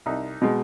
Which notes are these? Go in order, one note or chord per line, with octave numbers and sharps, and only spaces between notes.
C2 D#4
B2 G#3